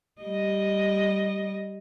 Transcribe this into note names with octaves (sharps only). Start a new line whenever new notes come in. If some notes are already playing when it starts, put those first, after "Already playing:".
G3 D#5